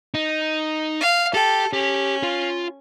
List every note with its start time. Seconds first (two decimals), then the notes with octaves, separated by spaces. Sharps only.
0.14 D#4
1.01 F5
1.34 G4 A4 G5
1.73 C#4 G4
2.23 F4